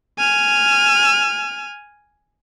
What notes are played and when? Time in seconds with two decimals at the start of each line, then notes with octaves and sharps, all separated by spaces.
0.18 G#5 F6